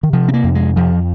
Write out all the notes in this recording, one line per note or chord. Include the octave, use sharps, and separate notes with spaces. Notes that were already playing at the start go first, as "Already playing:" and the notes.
D#3
C3 F3
C4
A#3
F2
G#3
F2 F3